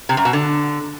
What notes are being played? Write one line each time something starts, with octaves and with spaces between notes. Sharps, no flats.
C3
F#2
B2
D3